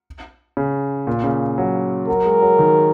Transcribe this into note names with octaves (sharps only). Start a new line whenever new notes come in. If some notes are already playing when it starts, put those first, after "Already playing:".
C#3
A#2
C#3
F#3
F#3 A#4
G#3
F#3
D#3